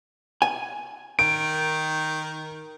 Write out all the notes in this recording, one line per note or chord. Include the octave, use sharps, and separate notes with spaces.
G#5
D#3 D7